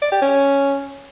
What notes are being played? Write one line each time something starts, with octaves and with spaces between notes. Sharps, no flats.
D5
G4
C#4